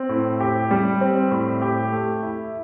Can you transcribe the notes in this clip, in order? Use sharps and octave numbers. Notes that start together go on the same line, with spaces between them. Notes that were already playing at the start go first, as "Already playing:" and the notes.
Already playing: C4
A2
G4
G3
C4
A2
G4
A3
E4